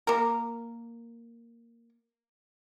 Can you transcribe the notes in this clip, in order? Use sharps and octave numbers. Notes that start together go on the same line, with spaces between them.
A#3 A#4